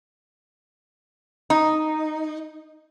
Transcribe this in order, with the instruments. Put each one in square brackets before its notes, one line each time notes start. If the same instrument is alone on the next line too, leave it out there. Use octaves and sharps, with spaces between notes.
[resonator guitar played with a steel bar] D#4